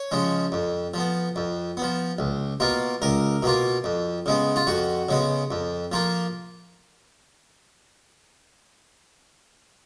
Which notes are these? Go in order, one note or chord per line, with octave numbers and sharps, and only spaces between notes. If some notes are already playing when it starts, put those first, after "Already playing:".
Already playing: C#5
C#3 F3 G#3
F2
F3 B3
F2
F3 B3
C#2
B2 A#3 F4
C#2 A#4
B2 A#3 F4
F2
C#3 G#3 B3
F4
F2 F#4
C#3 G#3 B3
F2
F3 A#3 F4